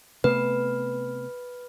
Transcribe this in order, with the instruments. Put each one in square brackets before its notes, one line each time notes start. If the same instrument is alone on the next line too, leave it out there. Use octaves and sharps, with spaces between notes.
[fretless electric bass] C3 A3 B3 [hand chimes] B4